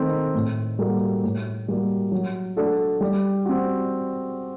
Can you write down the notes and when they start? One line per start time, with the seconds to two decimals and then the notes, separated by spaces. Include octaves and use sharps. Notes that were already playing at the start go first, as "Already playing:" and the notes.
Already playing: D#3 A3 C4 D#4
0.34 A2
0.79 G3 A#3 F#4 A4
1.23 A2
1.68 G3 A#3 F#4
2.12 F#3
2.57 A3 D4 F#4 A4
3.01 G3
3.45 C4 F#4